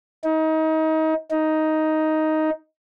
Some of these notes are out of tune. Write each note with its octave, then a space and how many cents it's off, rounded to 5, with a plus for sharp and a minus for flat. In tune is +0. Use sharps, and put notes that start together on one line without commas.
D#4 +30
D#4 +10